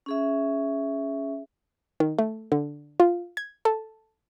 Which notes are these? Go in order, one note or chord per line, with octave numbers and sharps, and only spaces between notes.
C#4 G#4 E5
D#3
A3
D3
F4
G#6
A4